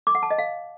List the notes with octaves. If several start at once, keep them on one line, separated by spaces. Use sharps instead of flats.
D6
F#5
A5
D#5
F5